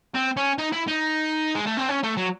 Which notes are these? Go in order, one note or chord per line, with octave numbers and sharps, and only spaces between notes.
C4
C#4
D#4
E4
D#4
G#3
A3
C4
C#4
A3
F#3